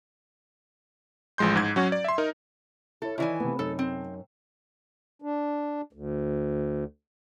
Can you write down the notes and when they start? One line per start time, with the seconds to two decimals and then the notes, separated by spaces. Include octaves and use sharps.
1.38 A1 F3 G#3 C6 G6
1.56 G#2 G#6
1.76 F#3 C#4 F#4
1.92 D5
2.04 E5 C6
2.18 D#4 A#4
3.02 E4 A4 C#5
3.18 D#3 E3 E4 C#5 D5 G#5
3.40 C3 A3 B3
3.59 F#2 D#4 A4
3.79 C4
5.22 D4
5.93 D2